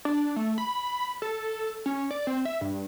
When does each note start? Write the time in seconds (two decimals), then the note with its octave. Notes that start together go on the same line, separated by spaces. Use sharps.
0.05 D4
0.36 A3
0.58 B5
1.22 A4
1.86 C#4
2.11 D5
2.27 C4
2.45 E5
2.61 G2